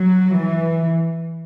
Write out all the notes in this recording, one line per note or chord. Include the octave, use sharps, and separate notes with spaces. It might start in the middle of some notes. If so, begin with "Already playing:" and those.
Already playing: F#3
E3